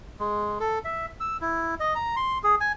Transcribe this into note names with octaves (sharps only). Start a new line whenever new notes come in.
G#3
A4
E5
E6
E4
D#5
A#5
C6
G#4
G#5